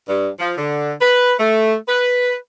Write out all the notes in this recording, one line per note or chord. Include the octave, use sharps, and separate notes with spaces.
G2
F3
D3
B4
A3
B4